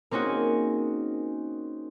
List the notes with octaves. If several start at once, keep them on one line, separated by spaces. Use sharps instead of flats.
A#3 C4 C#4 D#4 F#4 G#4